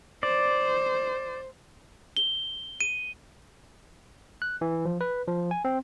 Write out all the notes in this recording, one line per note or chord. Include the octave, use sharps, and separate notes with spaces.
C5 D5
G7
D#7
F#6
E3
F3
B4
F3
G#5
C4